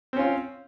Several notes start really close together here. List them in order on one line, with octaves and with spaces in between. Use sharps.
C4 C#4 F4